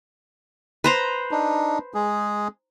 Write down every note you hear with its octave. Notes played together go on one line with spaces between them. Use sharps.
B4 C5 A#5
D4 D#4
G#3 G#4